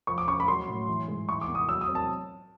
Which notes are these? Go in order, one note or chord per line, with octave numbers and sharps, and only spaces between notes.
F3 C#6
D6
C#4 C#6
B5
F#3 C6
A2
E3
G#2
E3 C#6
D6
B3
D#6
F#3 E6
D#6
C4
A5